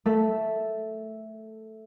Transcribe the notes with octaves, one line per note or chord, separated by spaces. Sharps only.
A3 A4 E5